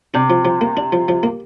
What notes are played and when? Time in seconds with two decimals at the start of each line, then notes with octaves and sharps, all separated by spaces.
0.14 C3 D4
0.30 F3
0.45 F3
0.61 A#3
0.77 D4
0.92 F3
1.08 F3
1.23 A#3